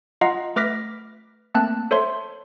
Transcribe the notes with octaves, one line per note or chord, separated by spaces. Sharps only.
F4 D#5 F5 F#5 A#5 C7
A3 B4 D6 F6 A#6 B6
A3 A#3 C4 A5 F#6
A4 C5 C#5 E5 C6